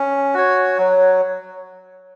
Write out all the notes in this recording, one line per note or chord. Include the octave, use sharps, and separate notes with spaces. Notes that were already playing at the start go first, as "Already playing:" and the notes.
Already playing: C#4
F#4 C#5
F#3